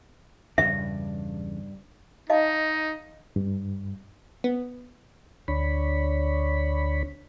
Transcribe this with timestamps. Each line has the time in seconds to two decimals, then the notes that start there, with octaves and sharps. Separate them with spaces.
0.58 E2 G2 C#3 D4 E5
2.30 D#4 D#5 F5 A5
3.36 G2
4.44 B3
5.48 D2 D4 C#5 B5